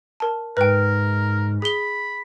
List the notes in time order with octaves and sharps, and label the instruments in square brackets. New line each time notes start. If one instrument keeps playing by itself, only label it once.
[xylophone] A#4 A5
[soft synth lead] G#2 [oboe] A#4 [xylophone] B4 G5
[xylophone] G#4 G7 [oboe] B5